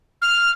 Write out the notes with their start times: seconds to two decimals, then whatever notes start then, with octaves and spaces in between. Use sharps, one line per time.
0.22 F6